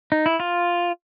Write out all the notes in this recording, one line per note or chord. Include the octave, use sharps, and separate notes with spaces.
D#4
E4
F4